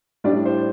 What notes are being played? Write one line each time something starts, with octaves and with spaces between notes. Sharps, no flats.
A2 G3 D4 D5
C5